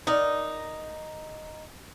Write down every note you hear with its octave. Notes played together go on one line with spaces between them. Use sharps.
D#4 A#4 D5 F#5